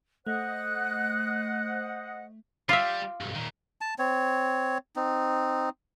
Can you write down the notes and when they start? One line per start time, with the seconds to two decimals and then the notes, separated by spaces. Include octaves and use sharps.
0.27 A3 C5 D#5 F#5 F#6
2.69 G3 F4 E5 F5 D6
3.21 B1 G2
3.35 A#2 D#3
3.81 A5
3.99 C4 C#5
4.96 C4 D#4